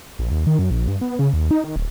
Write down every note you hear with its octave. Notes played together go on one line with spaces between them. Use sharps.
A#1
D#2
D#3
F#2
A#1
G2
B3
C#3
D#2
D#4
D#3
D1